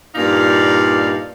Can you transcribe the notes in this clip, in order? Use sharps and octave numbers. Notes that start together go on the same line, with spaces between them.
G2 A#2 D#4 D5 F5